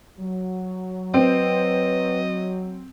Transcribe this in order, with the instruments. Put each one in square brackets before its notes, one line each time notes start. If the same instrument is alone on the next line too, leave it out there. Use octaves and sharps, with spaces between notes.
[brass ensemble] F#3
[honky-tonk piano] C4 [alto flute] B4 [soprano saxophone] D#5